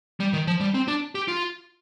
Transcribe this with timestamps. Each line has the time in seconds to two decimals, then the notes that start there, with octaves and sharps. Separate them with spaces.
0.20 G3
0.33 D#3
0.47 F3
0.60 G3
0.74 C4
0.88 D4
1.15 G4
1.28 F4